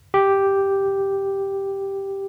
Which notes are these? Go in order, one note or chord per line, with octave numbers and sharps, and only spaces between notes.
G4